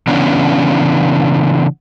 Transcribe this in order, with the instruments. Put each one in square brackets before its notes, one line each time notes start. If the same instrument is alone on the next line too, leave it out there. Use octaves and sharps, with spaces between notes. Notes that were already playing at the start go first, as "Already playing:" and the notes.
[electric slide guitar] C#3 E3 B3 C#4 D4